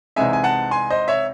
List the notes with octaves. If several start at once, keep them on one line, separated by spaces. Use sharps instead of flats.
C2 C3 E3 G#3 D#4 E5 G#5
G#5
F#5 A5
G#5 C6
C5 D#5
C#5 E5